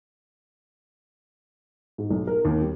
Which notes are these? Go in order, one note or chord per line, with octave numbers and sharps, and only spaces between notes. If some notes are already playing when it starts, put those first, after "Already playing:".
G#2
B1
A#4
D#2
G3